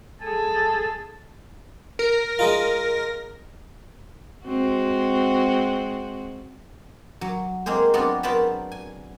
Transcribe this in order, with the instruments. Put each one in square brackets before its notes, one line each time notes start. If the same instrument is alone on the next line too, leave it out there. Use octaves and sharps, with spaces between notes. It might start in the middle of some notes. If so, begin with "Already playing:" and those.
[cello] G#4 A4
[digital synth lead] A#4
[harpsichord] G#3 D#4 F4
[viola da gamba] G#3 C4 F#4
[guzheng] F#3
G#3 A#3 C4 G#4 C5
F#3 B3 C4 D4 F4 F#4
F#3 B3 A#4 C5 A5 B5
G#5